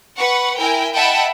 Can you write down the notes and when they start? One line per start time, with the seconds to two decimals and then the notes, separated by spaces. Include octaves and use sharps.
0.16 B4 F#5 C#6
0.57 E4 A#4 G5 G#5
0.94 D#5 E5 F#5 G5 A5 B5